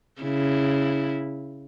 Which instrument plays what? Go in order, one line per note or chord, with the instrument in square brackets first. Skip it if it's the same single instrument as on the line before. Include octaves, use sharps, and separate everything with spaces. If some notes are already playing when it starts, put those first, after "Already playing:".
[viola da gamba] C#3 E4